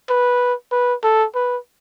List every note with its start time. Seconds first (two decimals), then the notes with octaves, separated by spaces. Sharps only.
0.09 B4
0.72 B4
1.03 A4
1.35 B4